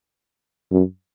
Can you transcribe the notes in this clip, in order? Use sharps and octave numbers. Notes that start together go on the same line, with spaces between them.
F#2